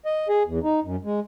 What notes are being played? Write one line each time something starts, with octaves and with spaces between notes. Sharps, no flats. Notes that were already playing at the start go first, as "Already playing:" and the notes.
D#5
G#4
E2
D#4
F#2
G#3